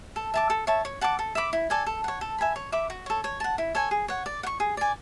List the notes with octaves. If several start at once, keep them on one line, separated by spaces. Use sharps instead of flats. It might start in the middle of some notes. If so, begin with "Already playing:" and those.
A4
E5 A5 D6
A4
C#5 E5 A5
C#5
F#5 A5 D6
A4
E5 B5 D6
E4
A4 D5 G#5
A4
C#5 F#5
A4
E5 G#5 B5
C#5
E5 B5 D6
F#4
A4 C#5
C#5
F#5 A5
E4
A4 C#5 G#5
G#4
C#5 F#5
D5
F#5
C#6
G#4
D5 G#5